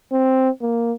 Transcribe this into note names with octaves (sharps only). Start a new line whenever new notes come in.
C4
A#3